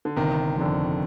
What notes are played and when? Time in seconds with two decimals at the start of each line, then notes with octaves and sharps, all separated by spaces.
0.05 D3
0.16 G1 C3 D#3
0.58 F2 D3